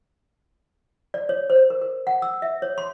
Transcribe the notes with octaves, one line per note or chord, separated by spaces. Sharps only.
D5
C#5
C5
A#4
A#4
F#5
E6
E5
C#5
C6